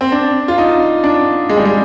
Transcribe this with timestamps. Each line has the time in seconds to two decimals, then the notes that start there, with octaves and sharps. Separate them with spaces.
0.01 C4
0.12 D4
0.48 F4
0.58 D#4
1.04 D4
1.49 G#3
1.58 G3
1.65 G#3